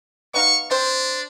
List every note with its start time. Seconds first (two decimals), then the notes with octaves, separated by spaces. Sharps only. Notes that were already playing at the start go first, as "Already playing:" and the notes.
0.34 B3 D#4 F5 C#6
0.71 C4 D4 C5